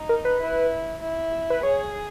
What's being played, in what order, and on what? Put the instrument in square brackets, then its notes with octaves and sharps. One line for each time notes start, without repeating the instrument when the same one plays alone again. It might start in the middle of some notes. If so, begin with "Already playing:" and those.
Already playing: [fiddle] D#4
[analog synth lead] A#4
B4
[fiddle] E4
E4
[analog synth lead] B4
[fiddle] G#4 [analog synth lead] C#5